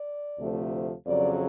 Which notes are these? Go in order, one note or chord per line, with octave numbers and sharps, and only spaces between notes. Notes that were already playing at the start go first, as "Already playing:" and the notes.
Already playing: D5
D2 C3 F3 A3
F2 C#3 F#3 D5